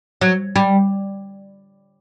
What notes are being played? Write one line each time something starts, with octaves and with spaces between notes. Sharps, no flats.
F#3
G3